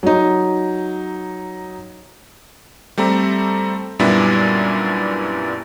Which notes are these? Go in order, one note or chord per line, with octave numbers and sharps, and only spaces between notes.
F#3 D#4
G3 A3 C4 A#5
F#2 A#2 G3 B3 D4 E4